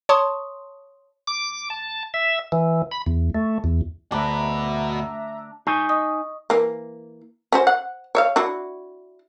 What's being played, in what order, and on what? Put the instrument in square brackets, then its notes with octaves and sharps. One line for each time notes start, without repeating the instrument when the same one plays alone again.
[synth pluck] C#5 A5 C6 C#6 D#6
[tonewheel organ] D6
A5
E5
E3
B5
E2
A3
E2
[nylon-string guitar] D2 [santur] D4 [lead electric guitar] F#4 B4 [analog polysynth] E5 A#5
[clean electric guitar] D#4 G#5 [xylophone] C#6
[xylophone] D#5 C#6 D#6
[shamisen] E3 A#3
C#4 F#4 C5
F#5
C#5 E5 F5
D4 E4 F#4